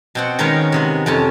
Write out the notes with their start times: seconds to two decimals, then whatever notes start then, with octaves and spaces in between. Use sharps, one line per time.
0.15 B2 C4 F#5
0.39 D#3 G#3 B3 C#4 A#4 C#5
0.72 C3 G#3 B3
1.06 F2 C3 C#4 A5